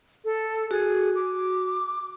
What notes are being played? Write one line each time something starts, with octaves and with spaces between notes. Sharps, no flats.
A4
F#4 G#4
D6